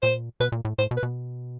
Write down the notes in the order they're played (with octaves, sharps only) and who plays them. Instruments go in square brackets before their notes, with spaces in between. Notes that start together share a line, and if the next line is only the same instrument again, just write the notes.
[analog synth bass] A#2 [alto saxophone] C5
[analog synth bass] B2 [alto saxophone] B4
[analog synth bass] A#2
A2
[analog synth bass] A2 [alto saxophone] C5
[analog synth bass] B2
[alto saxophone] B4
[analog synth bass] B2